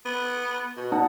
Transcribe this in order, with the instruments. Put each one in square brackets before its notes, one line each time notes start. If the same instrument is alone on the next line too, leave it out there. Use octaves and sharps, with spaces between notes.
[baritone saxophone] B3
B2
[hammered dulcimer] D#4 F#5 A5